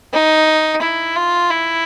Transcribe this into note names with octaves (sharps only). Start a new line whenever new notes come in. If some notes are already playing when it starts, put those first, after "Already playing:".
D#4
E4
F4
E4